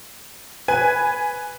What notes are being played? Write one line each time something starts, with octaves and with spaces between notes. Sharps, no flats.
B4 G#5